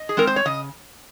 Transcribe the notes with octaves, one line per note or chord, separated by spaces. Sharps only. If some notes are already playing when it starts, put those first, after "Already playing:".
Already playing: D#5
G#4
G#3 C4 A#4
C5
C#5
C#3 D#5